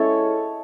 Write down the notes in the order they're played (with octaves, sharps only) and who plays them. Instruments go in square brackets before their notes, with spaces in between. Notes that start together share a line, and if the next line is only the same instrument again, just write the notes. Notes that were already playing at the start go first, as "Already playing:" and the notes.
Already playing: [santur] G#3 C#4 E4 A4 C#5